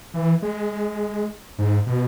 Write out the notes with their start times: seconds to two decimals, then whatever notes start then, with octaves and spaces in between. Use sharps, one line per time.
0.14 E3
0.42 G#3
1.59 G#2
1.86 B2